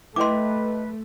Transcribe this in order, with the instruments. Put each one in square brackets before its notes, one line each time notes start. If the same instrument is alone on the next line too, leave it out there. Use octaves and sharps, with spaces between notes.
[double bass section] A3 [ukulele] E4 G4 D#5 [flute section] B4 [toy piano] C6 D6